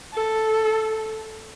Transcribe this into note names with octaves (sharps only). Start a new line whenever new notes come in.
A4